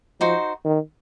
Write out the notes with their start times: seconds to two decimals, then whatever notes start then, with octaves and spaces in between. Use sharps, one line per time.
0.20 F3 D#4 F#4 C5
0.65 D#3